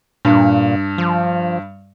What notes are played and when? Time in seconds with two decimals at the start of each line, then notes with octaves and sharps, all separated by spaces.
0.25 G2 A#2
0.98 F3